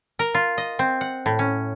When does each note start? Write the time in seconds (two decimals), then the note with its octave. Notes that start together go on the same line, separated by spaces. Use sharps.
0.19 A#4
0.34 F4
0.58 D#5
0.79 C4
1.01 F#5
1.26 A2
1.39 C#4